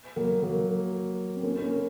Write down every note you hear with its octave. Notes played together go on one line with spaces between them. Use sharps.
F#3 A#3
F#3 A#3
C4
A#3 C#4
A#3 C#4